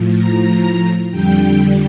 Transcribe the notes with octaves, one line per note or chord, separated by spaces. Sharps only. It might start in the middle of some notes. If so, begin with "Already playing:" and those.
Already playing: A2 F3
A#5
F2 D3 G3 G5